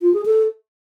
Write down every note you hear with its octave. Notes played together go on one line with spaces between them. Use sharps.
F4
G#4
A4